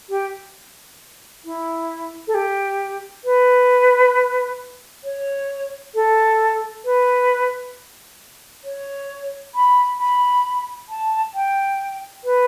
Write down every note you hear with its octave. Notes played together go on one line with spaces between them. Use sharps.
G4
E4
A4
G4
B4
C#5
A4
B4
C#5
B5
B5
A5
G5
B4